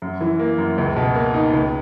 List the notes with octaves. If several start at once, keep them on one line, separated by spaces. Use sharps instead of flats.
F#2
E3
A#3
F#2
C#2
B2
A#3
D#4
C#2